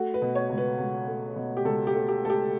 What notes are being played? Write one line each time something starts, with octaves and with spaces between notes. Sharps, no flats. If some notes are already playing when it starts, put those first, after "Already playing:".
Already playing: A3 F#4
B4
B2
C#5
C#2
B4
C#2
A3
B2
G4
C#2 A4
G4
A3
G4
A3 A4
G4